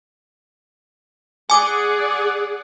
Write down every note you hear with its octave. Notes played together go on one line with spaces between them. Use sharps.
G#4 D5 F#5 G#5 D6